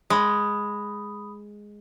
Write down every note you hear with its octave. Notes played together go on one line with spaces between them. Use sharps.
G#3 B5 D#6